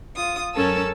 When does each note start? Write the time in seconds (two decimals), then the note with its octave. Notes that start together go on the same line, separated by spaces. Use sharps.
0.15 F4 D#6
0.54 F#2 C#4 A4 A#4 A5 E6